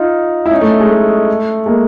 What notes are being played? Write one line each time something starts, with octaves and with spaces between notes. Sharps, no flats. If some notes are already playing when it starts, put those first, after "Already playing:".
Already playing: D#4 F4
E4
C#4 D#4
A3
G#3
A3
G#3 A#3